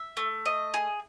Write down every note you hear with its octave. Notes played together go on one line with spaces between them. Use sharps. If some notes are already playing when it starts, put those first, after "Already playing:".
Already playing: E5
A3
D#5
G#4